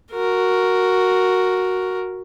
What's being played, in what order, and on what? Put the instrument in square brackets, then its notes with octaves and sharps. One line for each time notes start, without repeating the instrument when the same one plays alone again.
[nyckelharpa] F#4 A#4